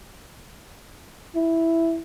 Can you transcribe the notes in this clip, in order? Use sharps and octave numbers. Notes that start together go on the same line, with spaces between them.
E4